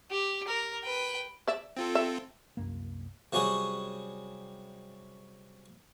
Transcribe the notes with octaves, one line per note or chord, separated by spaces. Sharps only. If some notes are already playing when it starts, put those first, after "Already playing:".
G4
A#4
B4 G5
D5 E5
C4 F4 A4
E5
C2 F#2 A#3
C3 F#3 G3 C#4 F#4 G#4